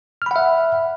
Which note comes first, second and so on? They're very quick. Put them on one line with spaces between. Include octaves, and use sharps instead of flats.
F6 B5 F#5 E5